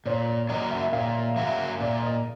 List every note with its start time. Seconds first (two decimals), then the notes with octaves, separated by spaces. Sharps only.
0.06 A#2 C#5
0.27 D5
0.49 F#3 A#3 C#4 F#4 D#5
0.71 E5
0.93 A#2 F5
1.36 F#3 A#3 C#4 F#4 E5
1.80 A#2 D5
2.03 D#5